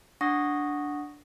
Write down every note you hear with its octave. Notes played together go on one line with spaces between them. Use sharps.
D4 F#5 C#6 D#6 A#6